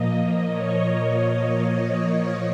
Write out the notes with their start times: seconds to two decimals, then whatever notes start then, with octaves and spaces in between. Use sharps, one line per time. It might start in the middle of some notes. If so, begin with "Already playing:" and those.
Already playing: A#2 F3 A#3 D#5
0.48 C#5